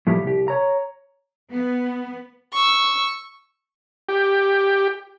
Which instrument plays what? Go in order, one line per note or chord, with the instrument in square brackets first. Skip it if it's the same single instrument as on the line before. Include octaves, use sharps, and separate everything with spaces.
[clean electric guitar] A2 F3 G3
C2 G4
C#5 A#5
[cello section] B3
[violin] C#6 E6
[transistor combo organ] G4